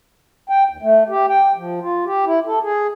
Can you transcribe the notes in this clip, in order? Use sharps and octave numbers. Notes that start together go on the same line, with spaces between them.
G5
D#2
A3
G4
G5
F3
F4
G4
E4
A4
G#4